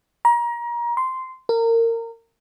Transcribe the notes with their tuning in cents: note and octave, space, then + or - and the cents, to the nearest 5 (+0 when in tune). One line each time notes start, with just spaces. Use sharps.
A#5 +30
C6 -10
A#4 -25